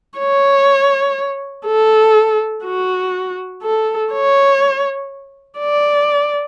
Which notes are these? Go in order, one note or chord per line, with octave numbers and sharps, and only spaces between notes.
C#5
A4
F#4
A4
C#5
D5